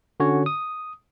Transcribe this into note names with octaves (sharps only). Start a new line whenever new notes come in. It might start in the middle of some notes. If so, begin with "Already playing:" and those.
D3 C#4 F#4 C#5
D#6